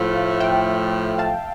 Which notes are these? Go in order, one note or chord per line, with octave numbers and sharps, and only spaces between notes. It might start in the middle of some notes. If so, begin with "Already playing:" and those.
Already playing: A2 F3 A3 F5
E5 G5
F5 A5